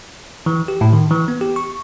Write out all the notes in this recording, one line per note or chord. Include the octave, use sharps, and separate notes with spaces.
E3
G4
A2
D#3
E3
B3
G4
C#6